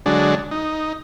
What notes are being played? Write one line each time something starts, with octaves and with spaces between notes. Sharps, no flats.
D3 F#3 G#3 D4
D#4